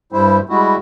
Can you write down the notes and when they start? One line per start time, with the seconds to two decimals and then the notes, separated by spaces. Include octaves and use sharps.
0.12 G2 G3 E4 C5
0.49 G3 G#3 E4 F#4